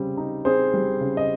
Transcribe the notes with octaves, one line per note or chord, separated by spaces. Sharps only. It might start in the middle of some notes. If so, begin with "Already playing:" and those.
Already playing: C#3 G3 C4
D#4
C4 G#4 C5
G3
C#3
D#5